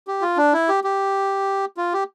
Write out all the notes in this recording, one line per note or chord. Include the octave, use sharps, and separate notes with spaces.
G4
F4
D4
E4
G4
G4
F4
G4